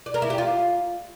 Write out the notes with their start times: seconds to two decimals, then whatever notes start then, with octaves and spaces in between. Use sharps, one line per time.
0.06 D5
0.14 A#4
0.22 E4
0.30 G4
0.38 F4